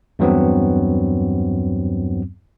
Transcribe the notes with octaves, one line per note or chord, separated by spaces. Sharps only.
E2 G2 F#3 B3 C4